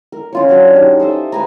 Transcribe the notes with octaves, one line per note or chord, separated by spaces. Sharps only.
A#4
C#4 F4 C#5
F#3 C#4 D4
D#4 G4
A4 C5 D#5 E5
B4 G#5 A#5